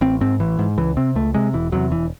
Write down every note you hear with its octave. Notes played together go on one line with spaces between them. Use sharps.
A1 C4
G#2 C4
A1 E3
G#2
C#2 E3
C3 C4
C#2 A3
C3 G#3
E1 E3
E2 C3 F#3
E1 E3